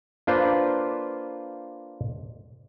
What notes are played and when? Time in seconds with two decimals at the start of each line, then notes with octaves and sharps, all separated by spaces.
0.27 A#3 D4 F4 B4 C5